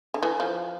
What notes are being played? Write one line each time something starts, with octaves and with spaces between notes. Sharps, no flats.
D3
E3
F3